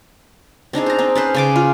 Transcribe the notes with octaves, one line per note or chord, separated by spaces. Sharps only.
C4 D4 D#4 G#4
C5 A#5
C4 D#4
C#4 B4 C5
C#3 C#4 D6
F4